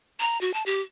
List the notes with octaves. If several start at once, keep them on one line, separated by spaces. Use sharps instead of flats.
A#5
F#4
A5
G4